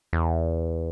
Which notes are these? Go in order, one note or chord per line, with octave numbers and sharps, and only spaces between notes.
E2